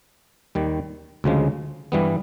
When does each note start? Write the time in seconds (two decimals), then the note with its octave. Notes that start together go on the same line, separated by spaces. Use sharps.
0.55 D#2 D#3 G3
1.24 D2 C#3 F3 G#3
1.92 G2 E3 G3 B3